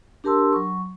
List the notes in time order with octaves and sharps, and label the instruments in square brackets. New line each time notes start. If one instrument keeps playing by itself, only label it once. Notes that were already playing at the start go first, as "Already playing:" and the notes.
[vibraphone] D4 G4 A#4 A5 C6 E6
F#3 C#6